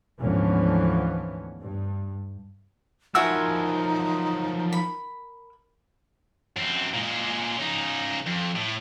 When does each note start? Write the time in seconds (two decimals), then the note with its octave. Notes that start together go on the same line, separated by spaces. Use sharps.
0.20 D2 G#2 E3 F3 B3 C#4
1.62 G2
3.15 F3 F#3 D#4 E4 F#4 A#4 G#5 E6
4.72 B5
6.56 F#2 C4
6.94 A#2 G#3
7.58 C#3 D#4
8.26 F2
8.55 A2